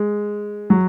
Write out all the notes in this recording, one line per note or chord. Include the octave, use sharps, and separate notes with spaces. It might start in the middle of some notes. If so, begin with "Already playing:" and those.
Already playing: G#3
F#3